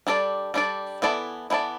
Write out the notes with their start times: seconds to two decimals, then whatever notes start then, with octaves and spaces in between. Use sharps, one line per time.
0.07 G3 D4 A4 D5
0.54 G3 D4 A4 D5
1.02 E3 B3 E4 A4 D5
1.50 E3 B3 E4 A4 D5